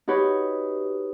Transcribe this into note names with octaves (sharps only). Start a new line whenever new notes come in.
D#4 F#4 G4 B4 C#5